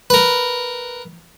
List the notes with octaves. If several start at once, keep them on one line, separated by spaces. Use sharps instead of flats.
A#4 B4